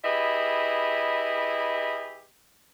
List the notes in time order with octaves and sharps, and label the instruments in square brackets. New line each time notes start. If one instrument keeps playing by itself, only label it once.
[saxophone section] E4 G4 G#4 B4 D#5 E5